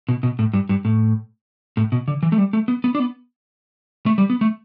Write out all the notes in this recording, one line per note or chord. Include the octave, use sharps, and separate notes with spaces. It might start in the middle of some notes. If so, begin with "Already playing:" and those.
B2
B2
A2
G2
G2
A2
A2
B2
D3
E3
A3
G3
A3
B3
B3
D4
B3
A3
G3
B3
A3